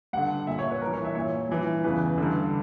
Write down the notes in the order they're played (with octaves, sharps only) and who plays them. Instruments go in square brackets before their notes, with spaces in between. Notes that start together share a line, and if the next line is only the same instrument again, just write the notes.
[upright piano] G2 D3 F#5
A#2 E5
C#5
B4
G2 E3 A#4
C#5
E5
A#2 C#5
G2 E3
E2 C#3 E3 B4
D3
G2